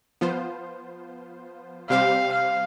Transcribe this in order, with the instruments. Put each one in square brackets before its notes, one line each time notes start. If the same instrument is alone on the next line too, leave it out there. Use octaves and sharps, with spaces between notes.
[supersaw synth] F3 B3 F4 C5
[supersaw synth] C3 G3 C4 G4 C5 [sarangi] F5
[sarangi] F5